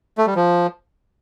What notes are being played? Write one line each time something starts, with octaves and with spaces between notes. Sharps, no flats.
A3
G3
F3